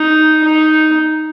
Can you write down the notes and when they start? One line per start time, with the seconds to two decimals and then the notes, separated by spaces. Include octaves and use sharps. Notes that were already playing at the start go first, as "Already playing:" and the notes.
Already playing: D#4
0.44 D#4